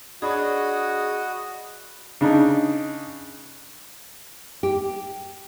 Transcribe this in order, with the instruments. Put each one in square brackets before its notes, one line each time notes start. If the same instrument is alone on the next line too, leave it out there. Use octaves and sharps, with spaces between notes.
[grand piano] D4 C#5 [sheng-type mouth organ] F#4 D#5 [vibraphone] G#4 [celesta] B5 D#6
[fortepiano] C#3 D4 D#4
[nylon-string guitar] G4